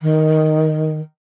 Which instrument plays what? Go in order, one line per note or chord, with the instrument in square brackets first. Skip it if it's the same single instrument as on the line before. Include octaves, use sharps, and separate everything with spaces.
[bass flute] D#3